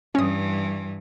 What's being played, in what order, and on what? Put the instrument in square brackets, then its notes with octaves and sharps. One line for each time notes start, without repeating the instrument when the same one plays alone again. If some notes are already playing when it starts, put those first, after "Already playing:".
[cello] G2 E3 [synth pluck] C#4 D#6